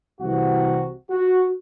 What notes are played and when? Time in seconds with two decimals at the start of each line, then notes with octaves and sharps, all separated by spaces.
0.20 C2 C3 E3 F#4
1.10 F#4